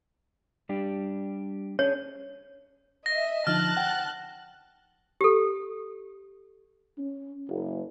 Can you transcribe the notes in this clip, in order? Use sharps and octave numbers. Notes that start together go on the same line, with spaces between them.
G3 D4 G4
C#4 D4 G#4 C#5
D#5 E5 A#6
D3 F3 D#4 A5 F6 F#6 A6
F#5 G5
G4 A4
C#4
F#1